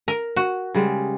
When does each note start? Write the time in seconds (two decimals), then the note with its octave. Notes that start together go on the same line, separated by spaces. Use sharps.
0.08 A#4
0.36 F#4
0.74 C#3 G3 G#3